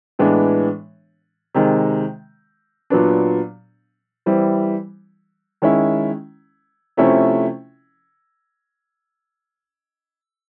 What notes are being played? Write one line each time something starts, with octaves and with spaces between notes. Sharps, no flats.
A2 E3 G#3 B3 D4
C3 D#3 G#3
A#2 F#3 B3 D4
E3 G3 C4 E4
D#3 G#3 C#4 E4
C3 F3 A3 C#4 E4